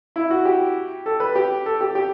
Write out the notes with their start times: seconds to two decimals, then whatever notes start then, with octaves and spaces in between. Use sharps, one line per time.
0.16 E4
0.30 F#4
0.45 G4
1.06 A4
1.20 B4
1.35 G4
1.66 A4
1.81 G4
1.95 G4